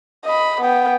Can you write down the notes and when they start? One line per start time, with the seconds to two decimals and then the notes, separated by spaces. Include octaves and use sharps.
0.25 D#5 B5
0.61 B3 G5